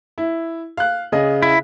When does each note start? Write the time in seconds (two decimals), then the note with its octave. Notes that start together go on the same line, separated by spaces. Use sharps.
0.18 E4
0.77 F5 F#6
1.12 C#3 G#4 D#5
1.42 E4